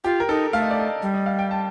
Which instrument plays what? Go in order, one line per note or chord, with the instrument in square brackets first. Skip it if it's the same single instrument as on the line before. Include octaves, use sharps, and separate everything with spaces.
[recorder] F4 [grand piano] G4
[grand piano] A#4
[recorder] D#4 [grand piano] A4
[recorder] A3 [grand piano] F5
[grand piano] D#5
D5
D#5
[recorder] G3
[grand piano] D#5
F5
G5
A5